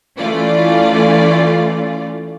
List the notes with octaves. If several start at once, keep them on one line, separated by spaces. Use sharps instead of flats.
E3 A3 C#4 F4 D5